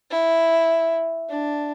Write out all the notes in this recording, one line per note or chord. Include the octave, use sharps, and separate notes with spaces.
E4
D4